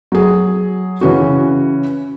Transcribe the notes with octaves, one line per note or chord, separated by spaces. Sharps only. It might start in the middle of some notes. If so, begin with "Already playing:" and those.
F#3 G#4
C#3 E3 C#4 F#4